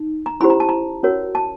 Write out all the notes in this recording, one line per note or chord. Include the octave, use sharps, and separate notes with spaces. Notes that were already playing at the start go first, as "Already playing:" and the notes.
Already playing: D#4
A#5
C#4 E4 G4 C5 B5
A#5
A5
A#5
C#4 F#4 A#4 C#5
A5